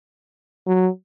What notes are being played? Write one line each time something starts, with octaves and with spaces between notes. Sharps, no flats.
F#3